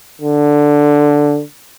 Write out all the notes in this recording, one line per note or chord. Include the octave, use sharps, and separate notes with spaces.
D3